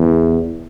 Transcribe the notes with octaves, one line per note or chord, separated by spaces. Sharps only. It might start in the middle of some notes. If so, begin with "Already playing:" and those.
Already playing: E2